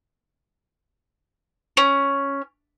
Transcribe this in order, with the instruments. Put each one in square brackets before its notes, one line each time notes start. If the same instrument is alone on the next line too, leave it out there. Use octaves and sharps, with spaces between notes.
[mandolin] C#4